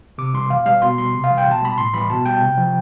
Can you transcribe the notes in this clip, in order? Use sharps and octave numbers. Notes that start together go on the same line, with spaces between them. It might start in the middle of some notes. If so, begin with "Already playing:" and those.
C3 D6
E3 G3 C6
B2 F5
G3 F5
B2 C6
G3 C6
C3
F5
E3 G3
G5
B2
A5
G3 B5
A2 C6
E3 G3 B5
B2 A5
G3 G5
C3
F3